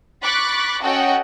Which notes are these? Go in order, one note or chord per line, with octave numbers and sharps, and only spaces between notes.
B5 C#6 D6 F#6 A6 B6
C#4 F#4 A4 D#5 F#5 G5